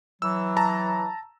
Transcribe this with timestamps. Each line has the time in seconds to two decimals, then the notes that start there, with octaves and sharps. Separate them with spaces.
0.22 E3 F#3 E6
0.57 A5 A#5